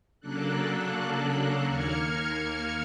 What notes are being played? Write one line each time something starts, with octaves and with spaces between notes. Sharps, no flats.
C#3 F#3 A#3 D4 A4 F#6
D#2 A#3 F6 G#6 C#7